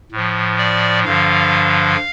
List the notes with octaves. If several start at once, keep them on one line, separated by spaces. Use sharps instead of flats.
A2 F3
D5
G2 D3 F3 F5